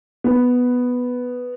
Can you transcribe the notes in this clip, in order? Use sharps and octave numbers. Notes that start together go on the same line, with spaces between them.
B3